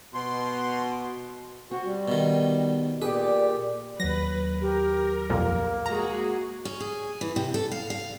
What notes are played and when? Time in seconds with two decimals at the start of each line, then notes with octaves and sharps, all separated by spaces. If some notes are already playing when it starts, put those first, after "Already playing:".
0.14 B2 C6
1.71 C4 F#4
1.85 G3
2.08 B2 D#3
3.02 A#2 G4 G#4 B4 D5
4.00 D#2 F#3 B4 A#6
4.61 G4 A#4
5.30 C2 F2 A#2 A#3
5.86 G#3 F#4 G#4 A#5
6.65 C#4
6.80 G#4
7.21 E3
7.36 C3
7.54 A4
7.72 F5
7.90 F5